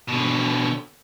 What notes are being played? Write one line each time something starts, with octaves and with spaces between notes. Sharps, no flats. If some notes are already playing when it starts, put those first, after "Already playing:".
B2 D3